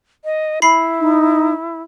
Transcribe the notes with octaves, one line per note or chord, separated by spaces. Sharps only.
D#5
E4 B5 C7
D#4